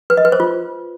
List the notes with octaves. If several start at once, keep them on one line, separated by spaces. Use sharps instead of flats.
B4
D#5
B4
C5
F4